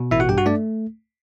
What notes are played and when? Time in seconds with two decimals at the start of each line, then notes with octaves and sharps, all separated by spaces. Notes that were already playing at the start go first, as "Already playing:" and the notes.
Already playing: B2
0.11 A1 E4 E5
0.20 F#4 F#5
0.29 G2 G4 G5
0.38 F#4 F#5
0.46 A3 D4 D5